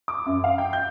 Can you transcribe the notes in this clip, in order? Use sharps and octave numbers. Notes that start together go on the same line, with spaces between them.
D6
F#2
F5
G5
G6